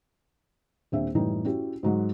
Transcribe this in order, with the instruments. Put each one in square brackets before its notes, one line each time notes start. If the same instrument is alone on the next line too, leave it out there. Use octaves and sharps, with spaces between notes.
[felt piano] D#1 C4 D4 E5
F#2 A2 E3 G3 C#4 D#4
C#4 E4 F#4 G4
G#2 F#3 G#3